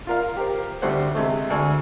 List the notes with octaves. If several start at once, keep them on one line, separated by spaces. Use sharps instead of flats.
F4 A#4 F5
G4 A#4 C5
D2 G3 A3 C5 F#5
C3 G#3 A3
D2 A4 G#5 C#6